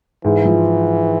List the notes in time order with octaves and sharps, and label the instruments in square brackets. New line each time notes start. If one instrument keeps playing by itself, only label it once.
[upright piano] G#2 [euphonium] E3
[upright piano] F3